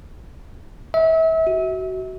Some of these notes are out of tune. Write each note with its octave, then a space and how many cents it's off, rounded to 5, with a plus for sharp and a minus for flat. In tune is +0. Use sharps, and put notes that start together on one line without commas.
E5 -35
F#4 +20